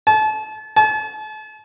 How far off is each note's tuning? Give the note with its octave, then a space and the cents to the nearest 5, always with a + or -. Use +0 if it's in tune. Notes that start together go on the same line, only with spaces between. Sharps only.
A5 -35
A5 -40